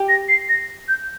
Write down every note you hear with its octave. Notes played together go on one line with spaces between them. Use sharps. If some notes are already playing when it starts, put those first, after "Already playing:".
Already playing: G4
A#6
C7
A#6
G6